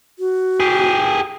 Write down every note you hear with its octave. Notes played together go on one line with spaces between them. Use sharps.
F#4
G4 G#4